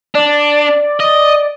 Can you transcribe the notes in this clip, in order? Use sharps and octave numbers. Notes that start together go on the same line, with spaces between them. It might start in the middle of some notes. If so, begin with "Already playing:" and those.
D4 D5
D#5